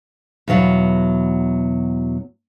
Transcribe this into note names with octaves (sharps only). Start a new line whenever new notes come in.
E2 B2 F#3 F5